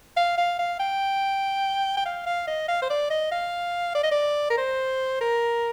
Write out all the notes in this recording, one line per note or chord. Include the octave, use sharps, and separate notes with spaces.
F5
F5
F5
G5
G5
F5
F5
D#5
F5
C5
D5
D#5
F5
D5
D#5
D5
A#4
C5
A#4